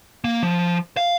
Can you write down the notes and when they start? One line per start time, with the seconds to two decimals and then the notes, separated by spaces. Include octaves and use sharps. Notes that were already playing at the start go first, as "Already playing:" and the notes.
0.24 A#3
0.43 F3
0.97 F5